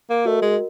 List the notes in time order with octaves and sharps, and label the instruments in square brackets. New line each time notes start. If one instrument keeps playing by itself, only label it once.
[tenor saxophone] A#3
[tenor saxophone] A3 [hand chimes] F#4 A#4 D#5
[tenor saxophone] G#3